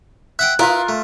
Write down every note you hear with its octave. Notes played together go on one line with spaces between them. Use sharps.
E5 F#5 G5 F#6
E4 F4 A#4 B4 F5 D#6
A3